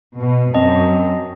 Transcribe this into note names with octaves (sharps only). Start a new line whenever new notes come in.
B2
F#2 C4 D#5 A5